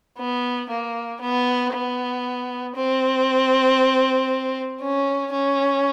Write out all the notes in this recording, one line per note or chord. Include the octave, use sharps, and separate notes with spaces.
B3
A#3
B3
B3
C4
C#4
C#4